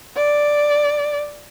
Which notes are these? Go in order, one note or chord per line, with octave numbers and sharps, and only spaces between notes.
D5